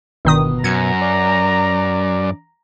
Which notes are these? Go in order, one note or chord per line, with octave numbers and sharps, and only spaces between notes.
G1 B2 D#3 D#6
F#2 A#5 G#6 C#7
D5